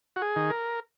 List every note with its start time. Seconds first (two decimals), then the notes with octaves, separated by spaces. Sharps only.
0.16 F#4
0.22 G#4
0.36 D#3
0.50 A#4